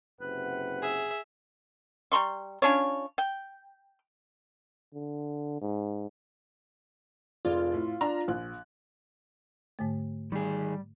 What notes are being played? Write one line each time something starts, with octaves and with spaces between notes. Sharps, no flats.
F#1 C3 B4 F#5
G#4 E5
G3 A#5 C6 C#6
C#4 D4 F4 C#5
G5
D3
G#2
F1 F4 G#4 D5
A2
D4 A#5
A#1 F#6
G#2 D3 A3
D#3 G3 G#4